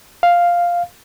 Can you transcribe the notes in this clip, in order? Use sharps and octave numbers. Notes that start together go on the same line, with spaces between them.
F5